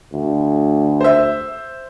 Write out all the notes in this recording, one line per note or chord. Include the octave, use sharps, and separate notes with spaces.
D2
C5 E5